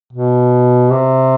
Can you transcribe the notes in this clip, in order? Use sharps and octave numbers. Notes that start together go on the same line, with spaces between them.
B2
C3